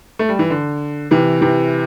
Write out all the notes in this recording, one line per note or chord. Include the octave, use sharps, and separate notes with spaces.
A3
G3
E3
D3
C3 E3
C3 E3